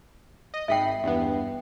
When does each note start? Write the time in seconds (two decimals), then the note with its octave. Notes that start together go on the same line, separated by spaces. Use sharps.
0.54 D#5
0.68 G#1 E5 G5 B5 C7
1.04 E2 G2 B3